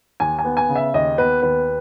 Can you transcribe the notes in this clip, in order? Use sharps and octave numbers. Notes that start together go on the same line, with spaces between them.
D#2 G#5
G#5
B3
G#5
C#3
E5
D#2 D#5
B3 B4
D#2 B4